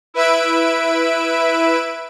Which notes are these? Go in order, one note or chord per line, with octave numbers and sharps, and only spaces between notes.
E4 B4 E5 E6 D7